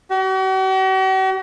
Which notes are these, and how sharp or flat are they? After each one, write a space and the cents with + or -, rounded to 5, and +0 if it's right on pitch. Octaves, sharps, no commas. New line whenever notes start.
F#4 +45